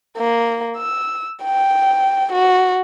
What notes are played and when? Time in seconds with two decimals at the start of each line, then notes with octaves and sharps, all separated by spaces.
0.17 A#3
0.77 E6
1.44 G5
2.33 F#4